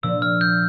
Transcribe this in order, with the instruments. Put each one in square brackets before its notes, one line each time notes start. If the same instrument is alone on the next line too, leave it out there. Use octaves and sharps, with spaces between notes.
[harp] A#2 F3 A#3 D4 [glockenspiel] E6
[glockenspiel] F6
G6